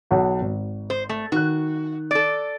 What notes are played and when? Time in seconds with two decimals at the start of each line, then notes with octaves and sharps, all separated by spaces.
0.11 B1 F#5
0.41 G#1
0.90 C5
1.09 A3
1.32 D#3 F#4 F#6
2.11 A4 D5